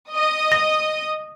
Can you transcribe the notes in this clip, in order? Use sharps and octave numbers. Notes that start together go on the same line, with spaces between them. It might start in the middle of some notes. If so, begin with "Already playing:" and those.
D#5 D#6
A#6